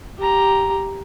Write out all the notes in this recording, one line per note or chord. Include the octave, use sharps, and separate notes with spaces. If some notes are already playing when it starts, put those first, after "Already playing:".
G4 A#5